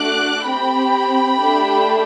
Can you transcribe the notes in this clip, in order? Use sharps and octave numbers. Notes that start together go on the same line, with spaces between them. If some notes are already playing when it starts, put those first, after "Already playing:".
Already playing: A3 D4 F#4 D6 F#6
C4 G4 G5 B5
A3 D4 G4